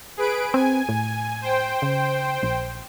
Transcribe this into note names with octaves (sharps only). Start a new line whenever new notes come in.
G#4 B4 D7
C4 G#5
A2
C5 G5
C#3
A#1